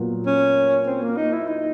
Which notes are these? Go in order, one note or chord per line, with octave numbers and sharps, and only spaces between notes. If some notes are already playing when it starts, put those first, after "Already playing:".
Already playing: A#2 F#3 B3
C#4
C4
A#3
D#4
E4
D#4